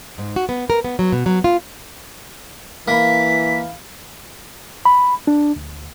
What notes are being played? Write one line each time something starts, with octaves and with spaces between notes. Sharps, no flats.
G#2
F#4
B3
A#4
B3
F#3
B2
F#3
F4
E3 A#3 F5 B5 B6
B5
D4
D2